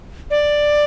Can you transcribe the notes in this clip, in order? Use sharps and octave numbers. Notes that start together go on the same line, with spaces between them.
D5